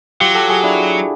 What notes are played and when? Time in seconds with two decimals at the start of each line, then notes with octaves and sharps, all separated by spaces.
0.21 F#3 F4 G4
0.35 G4 A4
0.49 F#4 G#4
0.64 D4 E4